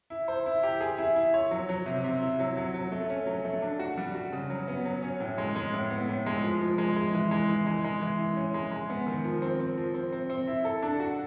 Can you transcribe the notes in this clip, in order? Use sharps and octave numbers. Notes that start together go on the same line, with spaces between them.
E4
C5
E4
G4
G#4
E4
E4
C#5
F#3
F#3
C3
C3
E4
F#3
F#3
F#3
A3
C#4
F#3
A3
D4
F#4
G3
F#4
C#3
F#3
B3
F#3
C#4
A2
G#3
G#3
A2
B3
A2
G#3
F3
F3
G#3
G#3
E3
G#3
E3
G#3
G#3
E3
E3
C#4
G#3
G#3
B3
D#3
F3
C4
C4
F3
C4
C4
C4
E4
A4
D4
F#4